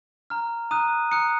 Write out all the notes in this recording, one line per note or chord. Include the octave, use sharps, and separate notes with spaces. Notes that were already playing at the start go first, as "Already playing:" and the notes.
A#5 F6
A#5 D#6 F#6 D#7
A#5 D#6 F#6 C#7